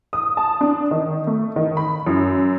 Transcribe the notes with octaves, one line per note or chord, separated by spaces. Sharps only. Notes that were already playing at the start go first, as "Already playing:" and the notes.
D#6
A5
D4
D#3
A3
D#3
B5
F#2